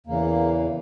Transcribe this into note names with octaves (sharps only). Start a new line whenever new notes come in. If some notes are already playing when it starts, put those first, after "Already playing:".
E2 C#3 E3 A#3